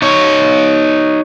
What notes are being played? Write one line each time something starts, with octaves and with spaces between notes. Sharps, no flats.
D#4 C#5